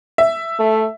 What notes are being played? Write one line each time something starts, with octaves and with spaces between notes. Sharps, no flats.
E5
A3